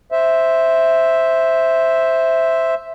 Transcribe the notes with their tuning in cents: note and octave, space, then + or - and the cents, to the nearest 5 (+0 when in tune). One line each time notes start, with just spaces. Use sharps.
C5 +0 E5 +0